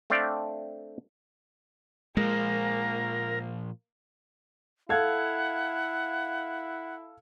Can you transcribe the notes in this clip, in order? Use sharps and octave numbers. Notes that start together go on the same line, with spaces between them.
A3 C4 D4 D5 F5 G5
A#2 F3 G#3 A#3 A#4
E4 A4 F5 F#5 G#6